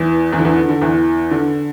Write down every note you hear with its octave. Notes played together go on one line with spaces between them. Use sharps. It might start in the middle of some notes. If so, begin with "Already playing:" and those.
Already playing: E2 E3
E2 E3
D3
E2 E3
D3
D3
E2 E3
D3